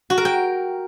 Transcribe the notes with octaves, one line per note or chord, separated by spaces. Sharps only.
F#4
A#4
G5